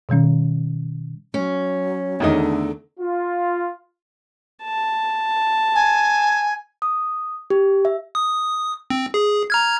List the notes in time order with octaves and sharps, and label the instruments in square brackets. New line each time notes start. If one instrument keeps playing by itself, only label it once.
[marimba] B2 D#3 G3 C#4
[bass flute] F#3 [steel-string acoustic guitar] C#4
[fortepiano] E2 D#3 D#5 [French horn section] D3 A3 [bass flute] A4
[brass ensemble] F4
[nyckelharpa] A5
[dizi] G#5
[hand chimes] D#6
G4
E5
[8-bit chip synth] D#6
C4
G#4
A#5 F6 G#6